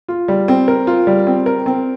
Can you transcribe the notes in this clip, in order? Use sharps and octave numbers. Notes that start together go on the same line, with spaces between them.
F4
G3
C4
A#4
F4
G3
C4
A#4
C4